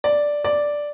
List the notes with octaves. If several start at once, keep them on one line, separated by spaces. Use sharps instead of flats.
D5
D5